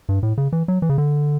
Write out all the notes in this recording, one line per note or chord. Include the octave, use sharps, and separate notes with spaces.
G2
A2
C#3
E3
F#3
E3
C#3
D3